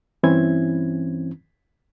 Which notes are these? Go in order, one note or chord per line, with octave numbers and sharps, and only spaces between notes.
G2 E3 C4 C#4 E4 G#6